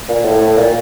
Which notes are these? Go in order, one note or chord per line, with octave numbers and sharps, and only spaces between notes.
A#2
A2
A2
A#2